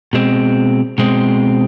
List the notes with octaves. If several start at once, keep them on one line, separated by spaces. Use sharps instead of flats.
B2 G#3 C4
B2 G#3 C4